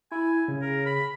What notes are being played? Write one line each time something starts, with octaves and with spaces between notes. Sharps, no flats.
E4 G#5
C#3
A#4
B5